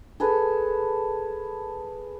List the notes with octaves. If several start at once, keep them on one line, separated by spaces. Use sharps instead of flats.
G#4 A4 B4